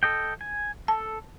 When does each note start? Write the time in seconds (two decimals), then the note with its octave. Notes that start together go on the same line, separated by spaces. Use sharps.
0.03 A4 D#5 G5
0.41 G#5
0.88 A4 A5